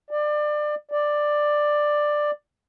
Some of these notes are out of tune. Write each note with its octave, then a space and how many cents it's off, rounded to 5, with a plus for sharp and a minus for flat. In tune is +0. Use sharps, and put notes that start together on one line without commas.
D5 +25
D5 +10